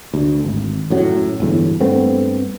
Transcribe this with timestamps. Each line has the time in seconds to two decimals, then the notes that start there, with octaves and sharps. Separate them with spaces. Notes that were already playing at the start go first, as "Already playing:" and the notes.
0.14 D2
0.45 G#1
0.90 F#2 A2 F#3
1.40 G1 E2 A2
1.80 G2 A3 B3 C4